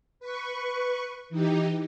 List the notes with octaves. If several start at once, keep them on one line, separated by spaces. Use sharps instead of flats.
B4 C#6
E3 D#4 G4